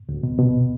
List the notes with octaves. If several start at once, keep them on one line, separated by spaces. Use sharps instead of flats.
D2
B2
B2